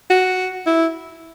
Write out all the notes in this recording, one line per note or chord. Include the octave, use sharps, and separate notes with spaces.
F#4
E4